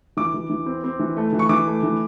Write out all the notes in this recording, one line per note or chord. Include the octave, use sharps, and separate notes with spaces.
E3 D6
E3
E3
C4
C4
E3
A3
E3
C#6
E3 D6
A3
E3